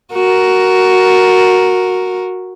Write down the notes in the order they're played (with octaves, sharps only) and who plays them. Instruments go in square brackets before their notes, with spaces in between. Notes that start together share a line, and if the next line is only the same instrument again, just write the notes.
[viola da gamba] F#4 A#4